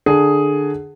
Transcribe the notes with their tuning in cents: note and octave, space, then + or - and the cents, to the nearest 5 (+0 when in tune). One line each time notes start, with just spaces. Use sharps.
D3 +20 G#4 +0